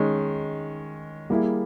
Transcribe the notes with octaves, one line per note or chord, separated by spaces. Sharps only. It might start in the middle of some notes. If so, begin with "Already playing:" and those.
Already playing: D#3 G#3 C#4
G3 A#3 E4 G#4